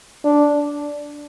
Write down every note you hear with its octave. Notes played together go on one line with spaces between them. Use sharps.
D4